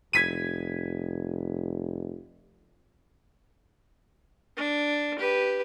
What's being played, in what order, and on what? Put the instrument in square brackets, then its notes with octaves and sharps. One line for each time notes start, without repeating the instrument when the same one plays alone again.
[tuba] F1 [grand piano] G#6 B6 D#7
[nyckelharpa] D4
G4 B4